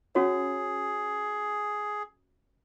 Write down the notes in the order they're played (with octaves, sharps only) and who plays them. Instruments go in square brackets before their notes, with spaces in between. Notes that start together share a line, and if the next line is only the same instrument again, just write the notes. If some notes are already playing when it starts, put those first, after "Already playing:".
[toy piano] C#4 F#4 C#5 [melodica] G#4